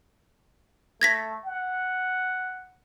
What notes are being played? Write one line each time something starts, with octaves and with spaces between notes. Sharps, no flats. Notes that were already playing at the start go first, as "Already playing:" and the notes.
A3 G#6 A#6 B6
F#5